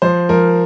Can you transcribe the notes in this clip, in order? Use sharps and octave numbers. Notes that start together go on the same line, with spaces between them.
F3 C5
F3 A#4